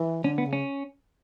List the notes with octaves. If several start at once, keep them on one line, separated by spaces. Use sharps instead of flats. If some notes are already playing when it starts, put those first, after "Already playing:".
Already playing: E3
D3 C#4
B3
C#3
C#4